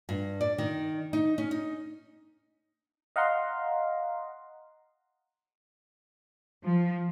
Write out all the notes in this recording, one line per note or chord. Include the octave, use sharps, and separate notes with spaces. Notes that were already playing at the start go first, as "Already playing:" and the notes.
G2
D5
D#3
D#4
C#4
D#4
D#5 F5 F#5 A#5 C6
F3